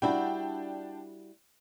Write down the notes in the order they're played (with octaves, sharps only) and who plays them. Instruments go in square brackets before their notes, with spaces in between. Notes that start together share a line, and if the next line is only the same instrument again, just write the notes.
[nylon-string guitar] G3 E4 F#4 [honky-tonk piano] D4 G5